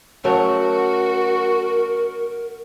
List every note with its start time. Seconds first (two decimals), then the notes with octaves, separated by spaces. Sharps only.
0.24 C#3 F#3 A3 F#4 A#4